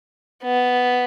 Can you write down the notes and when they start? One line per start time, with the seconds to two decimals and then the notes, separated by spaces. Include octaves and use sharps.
0.43 B3